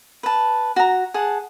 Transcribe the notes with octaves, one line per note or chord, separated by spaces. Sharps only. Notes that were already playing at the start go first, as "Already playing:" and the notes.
B4 A5
F#4 A#5
G#4 F#5 A5